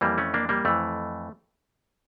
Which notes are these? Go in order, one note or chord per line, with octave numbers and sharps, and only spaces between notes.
F2 E3 G3 A#3
A3 C#4
A#3 D4
G3 A#3
F2 E3 A3